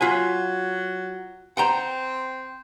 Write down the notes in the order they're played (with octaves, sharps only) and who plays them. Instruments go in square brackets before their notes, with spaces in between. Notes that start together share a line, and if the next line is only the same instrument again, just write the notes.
[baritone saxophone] F#3 [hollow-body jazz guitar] F4 G#5
[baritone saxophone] C4 [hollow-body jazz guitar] F#5 G5 A#5